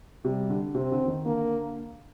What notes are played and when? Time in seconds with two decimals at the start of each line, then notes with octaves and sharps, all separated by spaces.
0.25 C3 G3
0.50 D3
0.75 C3 C4
0.92 D3
1.03 D3
1.08 D#3
1.26 D3 A#3